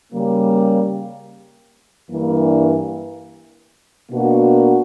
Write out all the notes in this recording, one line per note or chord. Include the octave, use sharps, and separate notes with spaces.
C#3 G3 A#3
G2 E3 A#3
B2 A#3 D4 F#4